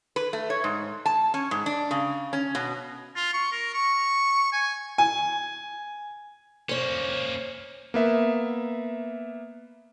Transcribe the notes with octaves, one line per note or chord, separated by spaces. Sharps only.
B4
A3
C#5
G#2
A5
C#4
G#2
D4
C#3
C#4
B2
F4
C#6
A#4
C#6
G#5
G#5
A#3 C#4 C5 C#5
A#3 B3 E5